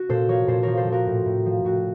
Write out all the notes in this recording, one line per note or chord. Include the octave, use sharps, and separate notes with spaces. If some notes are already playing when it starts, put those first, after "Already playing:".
Already playing: F#4
A#2 A4 C5
F3 A#4 C#5
A#2 A4 C5
F3 A#4 C#5
A4 C5
F3
F#4 A#4
A2
A2
F3
A2 F#4